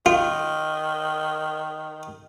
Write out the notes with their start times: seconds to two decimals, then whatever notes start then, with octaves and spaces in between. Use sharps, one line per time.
0.06 D#3 F4